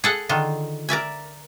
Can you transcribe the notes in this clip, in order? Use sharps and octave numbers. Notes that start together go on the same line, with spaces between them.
G#4 A4 F#5
D3 D#3 F4
A#4 D5 E5 G#5